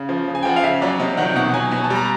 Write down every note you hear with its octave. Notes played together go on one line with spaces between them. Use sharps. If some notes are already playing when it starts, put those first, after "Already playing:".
Already playing: C#3
F3
C#3
G#5
G5
F3 F#5
F5
C#3 E5
F#3 D5
C3 D#5
D#3 F#3 F#5
B2 F#5
F#3 G#5
B2 G#5
A5
G3
A#5